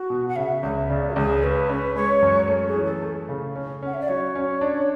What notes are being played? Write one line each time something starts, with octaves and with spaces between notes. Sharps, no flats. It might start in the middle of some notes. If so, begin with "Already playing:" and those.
Already playing: F#4
B2
F#5
C#3 E5
C#2 E5
C#3 D5
F#4
C#2 G#4
C#4 B4
C#4
G#3 C#5
F#2
A3
G#4
E3
A4
A3
C#3
C#4
C#4 F#5
E5
D5
F#3 C#5
C#4
D4